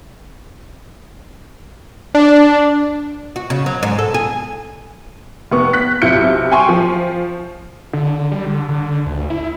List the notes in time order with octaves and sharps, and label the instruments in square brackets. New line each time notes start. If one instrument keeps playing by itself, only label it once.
[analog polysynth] D4
[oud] F#4
C#3
F#3
G#2
A4
G#4
[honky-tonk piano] F1 B3 C#6
F#6 B6
B1 C3 E4 F4 G6 C#7
G5 G#5 C6 C#6
F3
[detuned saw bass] D3
G3
D3
D3
D2
E4